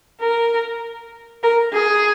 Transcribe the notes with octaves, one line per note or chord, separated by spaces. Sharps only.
A#4
A#4
G#4